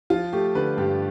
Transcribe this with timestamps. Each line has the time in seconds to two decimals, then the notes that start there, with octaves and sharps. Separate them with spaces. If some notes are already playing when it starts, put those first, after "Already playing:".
0.10 F3 F4
0.33 A3 G4
0.55 D3 B4
0.77 G2 G4